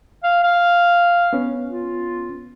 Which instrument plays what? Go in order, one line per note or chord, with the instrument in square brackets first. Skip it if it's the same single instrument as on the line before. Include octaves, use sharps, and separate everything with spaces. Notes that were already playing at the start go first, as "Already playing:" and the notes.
[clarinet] F5
F5
[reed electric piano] B3 C#4
[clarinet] F4